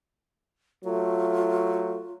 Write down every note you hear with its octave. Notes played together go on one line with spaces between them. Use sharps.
F#3 A3 F4